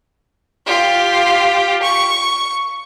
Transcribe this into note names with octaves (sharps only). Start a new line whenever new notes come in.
F4 G4
C#6